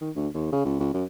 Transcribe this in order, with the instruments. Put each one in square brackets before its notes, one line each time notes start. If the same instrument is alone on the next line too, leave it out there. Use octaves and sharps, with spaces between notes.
[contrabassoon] D#3
D2
D#2
C#3
C#2
C#2
F#2